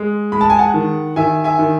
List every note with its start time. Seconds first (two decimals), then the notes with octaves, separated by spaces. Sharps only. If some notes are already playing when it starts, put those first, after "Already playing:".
Already playing: G#3
0.32 G#3 B5
0.41 A5
0.50 G#5
0.59 F#5 A5
0.74 D#3
1.16 D#3 E5 G#5
1.44 E5 G#5
1.59 D#3